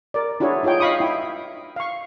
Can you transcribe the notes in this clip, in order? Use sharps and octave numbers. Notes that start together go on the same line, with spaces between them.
A#4 D5
D4 E4 F#4 G#4 C#5
D#4 F4 G#4 C#5 G5
D#5 F5 B5 C#6 D#6
E4 G5
F5 C#6